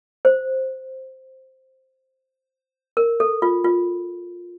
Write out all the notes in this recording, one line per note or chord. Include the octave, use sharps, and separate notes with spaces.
C5
A#4
A4
F4
F4